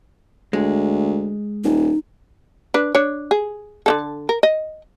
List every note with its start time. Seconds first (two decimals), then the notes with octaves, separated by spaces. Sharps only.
0.53 D2 G#3
1.64 D#1 D#4
2.74 D4 B4
2.95 D4 C#5
3.31 G#4
3.86 D3 D#3 A4
4.29 A#4
4.43 D#5